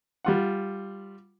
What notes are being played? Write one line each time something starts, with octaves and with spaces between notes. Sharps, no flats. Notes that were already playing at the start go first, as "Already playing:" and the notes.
G3 F4 F#5